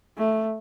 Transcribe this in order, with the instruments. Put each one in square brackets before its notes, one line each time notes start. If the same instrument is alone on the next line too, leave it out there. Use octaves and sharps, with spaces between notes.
[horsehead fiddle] A3